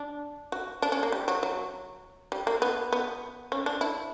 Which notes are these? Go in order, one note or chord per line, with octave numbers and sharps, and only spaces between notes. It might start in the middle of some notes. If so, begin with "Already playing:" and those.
Already playing: D4
F#4
D4
C#4
A#3
G3
F#3
F#3
G3
A#3
B3
B3
C#4
D4
E4